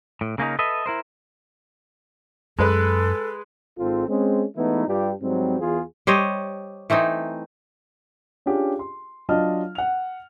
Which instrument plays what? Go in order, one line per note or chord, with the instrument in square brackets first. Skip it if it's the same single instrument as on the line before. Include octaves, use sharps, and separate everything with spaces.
[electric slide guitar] A2
C#3 A#3 C#4 D#4
A4 B4 D#5 E5
E4 A#4 C5
[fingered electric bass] F#2 [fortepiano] G#3 B4 [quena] A4
[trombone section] G#1 G#2 C4 F4 A4
G#3 C4 C#4
E3 G#3 A3 B3 D#4 E4
G2 G3 D4 F4 G4
G#2 F#3 G3 C4
E2 F4 G#4
[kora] G3 C5 C#5 D#5
E3 A3 C4 D#4
[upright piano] C#4 D4 F4 G4 G#4
C6
F#3 D4 F4 D#5 A5 F6
F#5 F7